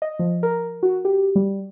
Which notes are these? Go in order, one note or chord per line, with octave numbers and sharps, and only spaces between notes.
D#5
F3
A#4
F#4
G4
G3